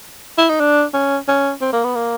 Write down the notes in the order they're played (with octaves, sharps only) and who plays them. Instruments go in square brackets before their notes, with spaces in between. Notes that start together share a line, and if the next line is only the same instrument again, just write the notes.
[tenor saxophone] E4
D#4
D4
C#4
C#4
C4
A#3
B3
A#3